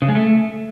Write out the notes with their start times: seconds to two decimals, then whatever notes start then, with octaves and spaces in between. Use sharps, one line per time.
0.02 C#3
0.09 G#3
0.15 A3